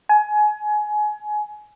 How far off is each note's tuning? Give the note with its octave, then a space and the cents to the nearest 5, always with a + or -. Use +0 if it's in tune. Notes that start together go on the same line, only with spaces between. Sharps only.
G#5 +25